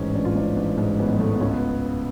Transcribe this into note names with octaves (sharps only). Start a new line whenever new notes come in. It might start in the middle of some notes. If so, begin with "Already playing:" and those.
Already playing: A1 G#2 C#4
A1 D4
F4
G#2 D4
A1
G#2
A1 B3
G#3
G#2 A3
B3
C#2 C#4
B3